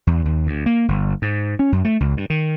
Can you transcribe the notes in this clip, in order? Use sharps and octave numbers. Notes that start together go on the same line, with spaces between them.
E2
D#2
D2
A#3
G1
G#2
C#4
F#2
A3
C#2
G2
D#3